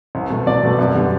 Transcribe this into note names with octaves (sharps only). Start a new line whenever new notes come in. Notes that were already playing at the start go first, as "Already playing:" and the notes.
C2
B2 A3
C2 D5
B2 A3
F#2
D3 G3 B3